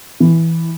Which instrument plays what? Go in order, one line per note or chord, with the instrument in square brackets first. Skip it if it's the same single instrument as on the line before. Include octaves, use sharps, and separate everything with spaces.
[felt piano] E3